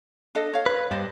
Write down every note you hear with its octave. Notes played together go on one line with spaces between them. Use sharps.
D4 A4 D#5
C#5 F5
B4
G2 C5 D5 D#5